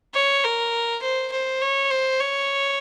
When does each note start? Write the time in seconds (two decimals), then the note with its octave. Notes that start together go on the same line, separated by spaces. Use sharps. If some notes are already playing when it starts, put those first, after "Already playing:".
0.15 C#5
0.44 A#4
1.03 C5
1.32 C5
1.62 C#5
1.91 C5
2.20 C#5